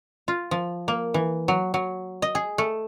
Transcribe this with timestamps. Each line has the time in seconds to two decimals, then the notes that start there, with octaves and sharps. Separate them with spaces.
0.28 F4
0.51 F3
0.88 A#3
1.14 E3
1.48 F#3
1.74 F#3
2.22 D#5
2.35 G#4
2.58 A3